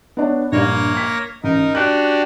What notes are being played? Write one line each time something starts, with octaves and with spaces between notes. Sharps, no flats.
B3 D4 C#5
A#1 G2 A#3 C#5 A#6
B6
A1 D#4 A#4
D4 F#4 G4 F#6